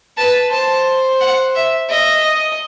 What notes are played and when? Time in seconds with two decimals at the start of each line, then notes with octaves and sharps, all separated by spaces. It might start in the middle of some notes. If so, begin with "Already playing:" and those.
0.17 B4 A5
0.52 C5 A5
1.21 F#5
1.55 E5
1.89 D#5 E5
2.23 D#5